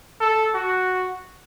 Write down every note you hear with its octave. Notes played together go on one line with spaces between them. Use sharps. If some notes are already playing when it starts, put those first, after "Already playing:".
A4
F#4